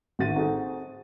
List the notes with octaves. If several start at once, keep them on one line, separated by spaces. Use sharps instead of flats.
A1 D#3 F#4 A6 D#7
C4 D#4 F#4 G#4 A4